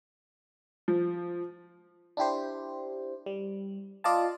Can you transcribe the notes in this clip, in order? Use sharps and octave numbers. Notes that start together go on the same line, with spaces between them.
F3
D4 E4 G4 C5
G3
F4 D5 D#5 F5 A5